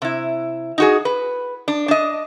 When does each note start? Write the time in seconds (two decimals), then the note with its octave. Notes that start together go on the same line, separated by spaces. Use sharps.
0.02 C3 E4
0.78 D#4 F#4 G#4
1.05 B4
1.68 D4
1.88 D4 D#5